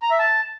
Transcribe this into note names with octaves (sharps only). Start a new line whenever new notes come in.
A#5
E5
A5